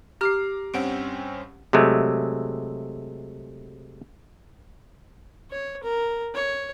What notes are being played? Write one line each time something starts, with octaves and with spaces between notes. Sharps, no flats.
G4 A#5 D6 F6 C7
G2 C4 C#4 F#5 D7
C3 F#3 G#3 A3
C#5
A#4
C#5